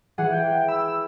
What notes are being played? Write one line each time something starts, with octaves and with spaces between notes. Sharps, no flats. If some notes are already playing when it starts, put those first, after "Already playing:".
E3 G#4 F#5
G5
B5 E6